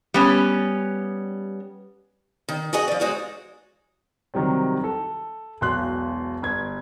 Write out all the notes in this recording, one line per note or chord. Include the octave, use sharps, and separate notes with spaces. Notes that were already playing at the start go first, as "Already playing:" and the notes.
G3 B3 C#4
D#3
F#4 G#4 D#5 F#5
F3 D5
G#3 D#4 F#4 C#5 D5
C3 D#3 F#3 G3 C4
A4
E1 B1 C6 F#6
G1 G#6